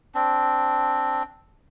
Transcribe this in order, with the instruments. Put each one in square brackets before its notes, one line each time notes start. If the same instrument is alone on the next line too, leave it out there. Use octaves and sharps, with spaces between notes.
[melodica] C4 D4